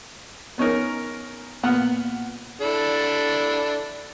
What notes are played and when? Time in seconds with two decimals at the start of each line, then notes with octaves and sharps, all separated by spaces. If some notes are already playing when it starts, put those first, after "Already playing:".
0.58 B3 C#4 D#4 A#4
1.63 A#2 B3 F#5 F6
2.61 D4 E4 A4